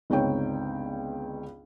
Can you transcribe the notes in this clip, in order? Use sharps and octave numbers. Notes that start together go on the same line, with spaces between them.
G1 C#2 C4 D#4 C#5 G5